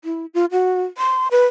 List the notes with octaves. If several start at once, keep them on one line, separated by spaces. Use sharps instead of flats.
E4
F4
F#4
C6
B4